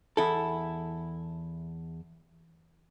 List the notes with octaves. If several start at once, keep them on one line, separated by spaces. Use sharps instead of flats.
E2 E4 A4